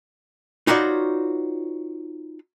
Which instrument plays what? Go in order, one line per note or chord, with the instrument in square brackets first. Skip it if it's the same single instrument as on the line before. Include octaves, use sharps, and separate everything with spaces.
[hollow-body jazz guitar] D#4 F4 F#4 B4 C#5 D5